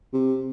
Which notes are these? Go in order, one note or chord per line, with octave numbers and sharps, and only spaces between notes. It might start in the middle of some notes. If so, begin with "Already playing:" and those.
C3